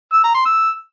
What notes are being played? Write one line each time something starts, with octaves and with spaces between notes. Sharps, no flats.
E6
A#5
C6
E6